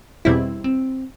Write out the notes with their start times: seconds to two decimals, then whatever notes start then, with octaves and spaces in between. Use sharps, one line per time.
0.25 E2 B2 G3 C4 D4 E4
0.64 C4